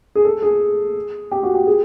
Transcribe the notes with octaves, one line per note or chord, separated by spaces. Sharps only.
G#4
A4
G#4
G4
F#4
G4
G#4